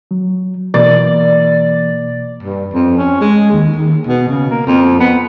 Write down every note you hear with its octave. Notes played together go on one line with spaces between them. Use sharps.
F#3
B2 E3 A#3 D5
G2
F2
C#4
G#3
D#2
D#2
B2
C#3
A#3
F2
B3